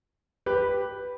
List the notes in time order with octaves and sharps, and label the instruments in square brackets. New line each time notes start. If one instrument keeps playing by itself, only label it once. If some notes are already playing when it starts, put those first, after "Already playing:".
[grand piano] G4 B4